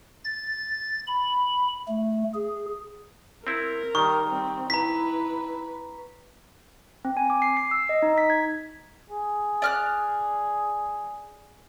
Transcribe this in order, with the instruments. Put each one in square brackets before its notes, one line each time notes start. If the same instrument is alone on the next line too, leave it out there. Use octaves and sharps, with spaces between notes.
[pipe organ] A6
B5
A3
G#4
[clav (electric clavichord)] C4 E4 [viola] A#4
[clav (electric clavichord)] D#3 [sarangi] G3 [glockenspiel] C#6
[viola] G3 [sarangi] C4
[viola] E4 [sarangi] B4 [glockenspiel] A#5 B6
[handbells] C4
G#5
D6
C7
C7
E6
D#5
D#4
B6
G#6
[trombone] G#4
[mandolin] D5 F6 F#6